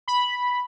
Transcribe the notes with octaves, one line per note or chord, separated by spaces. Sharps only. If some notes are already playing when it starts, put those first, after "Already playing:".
B5